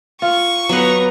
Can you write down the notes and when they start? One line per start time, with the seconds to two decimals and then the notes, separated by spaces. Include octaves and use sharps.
0.22 F4 C#6
0.69 F#3 B3 B4 A#5